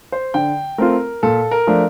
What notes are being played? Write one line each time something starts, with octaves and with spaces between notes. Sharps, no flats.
C5
D3 G5
A3 C4 F4 A#4
A#2 A4
A#4
F3 A3 D4